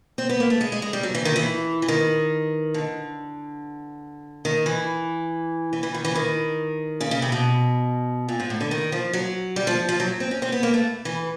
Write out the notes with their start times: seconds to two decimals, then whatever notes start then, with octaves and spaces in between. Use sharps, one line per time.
0.18 C4
0.29 B3
0.40 A#3
0.50 A3
0.61 G#3
0.72 G#3
0.82 G#3
0.93 G3
1.03 F#3
1.14 E3
1.25 D#3
1.36 E3
1.82 E3
1.88 D#3
2.74 D3
4.45 D#3
4.66 E3
5.73 E3
5.83 E3
5.94 D#3
6.04 E3
6.15 D#3
7.01 C#3
7.11 C#3
7.22 C3
7.32 B2
8.29 A#2
8.40 G#2
8.50 A2
8.61 D3
8.71 D#3
8.92 F3
9.13 F#3
9.56 G3
9.67 F3
9.89 F3
10.00 F#3
10.20 C4
10.31 C#4
10.42 C4
10.52 B3
10.63 A#3
10.74 A3
11.05 E3